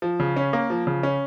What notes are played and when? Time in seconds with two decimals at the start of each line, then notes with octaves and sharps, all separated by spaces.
0.02 F3
0.20 C#3
0.37 C#4
0.53 A#3
0.70 F3
0.87 C#3
1.03 C#4